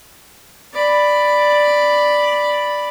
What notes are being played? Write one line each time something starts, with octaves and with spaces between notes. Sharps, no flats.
D5 B5